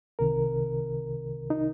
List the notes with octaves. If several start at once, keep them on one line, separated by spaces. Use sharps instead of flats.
C2 C3 D#3 A#4
D#4